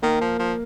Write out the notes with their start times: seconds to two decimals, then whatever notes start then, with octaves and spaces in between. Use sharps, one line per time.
0.02 D#3 A#3
0.21 F3
0.39 F3